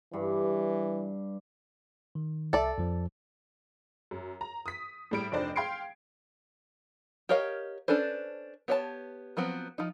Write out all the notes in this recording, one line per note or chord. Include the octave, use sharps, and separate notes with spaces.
G2 E3
D#3
C2 A4 D5 E5
F2 F3
F#2
A#5
D#6 B6
A2 G3 D7
F1 D4 D#4 C5 D5
F5 G5 C6 G#6 C7 D7
G4 A#4 C#5 D#5 F5
C#4 D4 A4 B4 C5
B3 G4 C#5 F5 A5
F3 F#3 B3 C4
F3 D#4